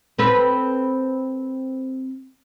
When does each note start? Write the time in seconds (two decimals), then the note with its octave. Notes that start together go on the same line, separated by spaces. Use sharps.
0.19 C4 A4 B4